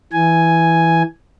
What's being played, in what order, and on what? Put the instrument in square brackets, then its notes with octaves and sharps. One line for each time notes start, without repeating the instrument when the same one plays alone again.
[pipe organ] E3 G#5